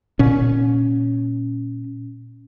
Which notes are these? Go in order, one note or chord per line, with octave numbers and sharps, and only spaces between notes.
A#2 C#4